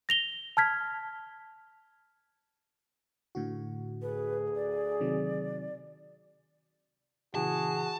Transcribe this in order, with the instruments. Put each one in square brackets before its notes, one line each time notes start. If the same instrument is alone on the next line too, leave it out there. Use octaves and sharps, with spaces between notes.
[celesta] A#6 F7 G7
A5 F6 G#6 B6
[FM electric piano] A2 D3 F#4
[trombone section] D2 G#4 [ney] B4
[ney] D5
[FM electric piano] C3 D#3 F#3
[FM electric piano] A#2 C#3 E3 [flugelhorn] F#4 [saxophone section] G#4 [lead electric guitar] A5